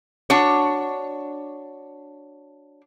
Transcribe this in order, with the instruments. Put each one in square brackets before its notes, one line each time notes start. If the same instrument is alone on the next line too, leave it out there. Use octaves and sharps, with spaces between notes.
[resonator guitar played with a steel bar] D4 F#4 C#5